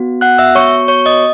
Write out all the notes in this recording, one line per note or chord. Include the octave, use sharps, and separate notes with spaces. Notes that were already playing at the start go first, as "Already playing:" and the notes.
Already playing: B3 F#4
F#5 F#6
E5 E6
C#5 C#6
C#5 C#6
D#5 D#6